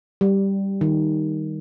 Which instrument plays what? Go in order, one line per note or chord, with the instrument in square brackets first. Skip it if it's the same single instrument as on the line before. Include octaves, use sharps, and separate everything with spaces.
[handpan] G3
D#3